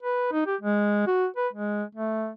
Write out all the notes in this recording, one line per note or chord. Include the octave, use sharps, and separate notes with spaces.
B4
D#4
G4
G#3
F#4
B4
G#3
A3